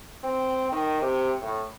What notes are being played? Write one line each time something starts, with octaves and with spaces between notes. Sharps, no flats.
C4
D#3
C3
A2